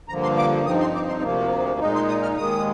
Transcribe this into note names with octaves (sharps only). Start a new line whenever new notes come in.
G2 D3 F3 A#3 A#5
C6
D6
G2 F3 C4 D#4 D#6
C6
D6
C6
D2 C3 F3 A#3
A#2 G#3 D#4
C6
D#6
F6
D#2 D#3 G#3 D#6